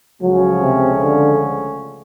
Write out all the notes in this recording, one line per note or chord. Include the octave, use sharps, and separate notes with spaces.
C#2 C#3 F3 F#3 A3 C#4
C3
D3